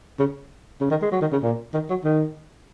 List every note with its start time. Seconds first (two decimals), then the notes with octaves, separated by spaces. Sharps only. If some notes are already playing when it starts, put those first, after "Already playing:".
0.19 C#3
0.81 C#3
0.91 D#3
1.02 G#3
1.12 F#3
1.22 D#3
1.33 C#3
1.42 A#2
1.74 D#3
1.90 F#3
2.05 D#3